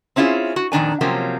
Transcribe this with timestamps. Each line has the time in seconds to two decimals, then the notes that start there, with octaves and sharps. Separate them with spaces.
0.16 C4 C#4 E4 F4 G#4
0.56 F#4
0.72 F2 A#2 D#3 D4 G#5
1.01 C3 F3 F#3 A#3 C4 C#4